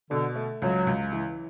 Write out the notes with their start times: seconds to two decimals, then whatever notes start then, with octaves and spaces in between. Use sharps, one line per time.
0.11 B2 D3
0.36 A3
0.62 C#2 F#3
0.87 C#2
1.13 E3